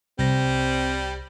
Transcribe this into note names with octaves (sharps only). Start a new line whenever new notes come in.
C2 G3 C4 A#6